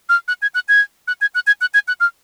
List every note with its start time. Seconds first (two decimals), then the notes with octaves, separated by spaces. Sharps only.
0.09 F6
0.28 F#6
0.42 G#6
0.55 F#6
0.69 G#6
1.08 F#6
1.21 G#6
1.35 F#6
1.47 G#6
1.61 F#6
1.74 G#6
1.88 F#6
2.00 F6